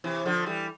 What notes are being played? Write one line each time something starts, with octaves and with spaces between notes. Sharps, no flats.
C3 E3
D3 F3
E3 G3